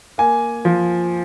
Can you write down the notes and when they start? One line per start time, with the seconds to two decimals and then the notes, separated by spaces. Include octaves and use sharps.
0.18 A#3 G#5
0.65 F3